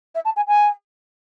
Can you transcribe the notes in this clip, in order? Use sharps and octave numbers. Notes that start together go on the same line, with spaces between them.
E5
A5
G#5
G#5